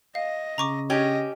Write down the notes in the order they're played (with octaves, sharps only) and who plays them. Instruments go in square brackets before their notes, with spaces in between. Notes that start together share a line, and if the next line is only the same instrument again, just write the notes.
[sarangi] D#5 [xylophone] F5
[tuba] C#3 [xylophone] A#5 C#6 D6
[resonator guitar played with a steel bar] C#4 G4 [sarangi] D#5